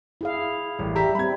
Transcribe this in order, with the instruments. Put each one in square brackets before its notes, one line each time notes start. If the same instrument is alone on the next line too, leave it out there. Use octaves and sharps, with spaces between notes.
[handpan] E4 G#4 F5
[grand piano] A1 [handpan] G3
[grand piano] G4 E5 A#5
[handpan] G3 C4 [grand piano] B5 G#6